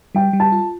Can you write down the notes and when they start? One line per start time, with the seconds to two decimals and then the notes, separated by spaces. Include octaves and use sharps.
0.15 G3 G5
0.33 G3
0.40 A5
0.52 F4